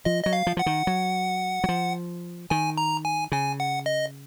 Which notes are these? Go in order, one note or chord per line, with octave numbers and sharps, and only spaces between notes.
F3 D#5
F#3 D#5
F5
F3
F3 F#5
D#3
F#3
F#3
F3
D#3 G#5
A#5
G#5
C#3 G#5
F#5
D#5